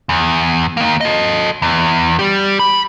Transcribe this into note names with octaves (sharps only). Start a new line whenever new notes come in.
E2
D#3 A#3
A4 D#5
E2
G3 G4
B5